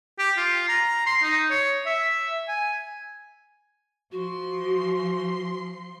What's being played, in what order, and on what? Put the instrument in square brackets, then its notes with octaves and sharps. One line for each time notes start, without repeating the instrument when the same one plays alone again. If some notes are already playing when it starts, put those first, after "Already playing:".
[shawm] G4
F4
A#5
C6
D#4
C#5
E5
G#5
[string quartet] F3 C6 [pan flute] F#4